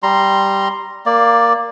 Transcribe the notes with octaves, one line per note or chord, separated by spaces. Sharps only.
G3 A#5 C6
A#3 D5